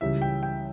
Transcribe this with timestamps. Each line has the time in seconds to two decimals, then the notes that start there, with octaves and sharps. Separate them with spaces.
0.01 C#2 C#3 E3 G3 E5
0.22 G5
0.43 G5